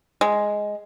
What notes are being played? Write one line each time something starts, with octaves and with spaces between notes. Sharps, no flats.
G#3